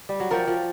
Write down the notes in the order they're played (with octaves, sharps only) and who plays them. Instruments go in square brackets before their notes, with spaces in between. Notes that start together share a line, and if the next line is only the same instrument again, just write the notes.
[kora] G3
F#3
[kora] F3 [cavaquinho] F#4 A#4 D5 G5
[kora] F3